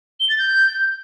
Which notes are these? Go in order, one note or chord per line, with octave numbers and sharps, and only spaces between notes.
G7
A6
G6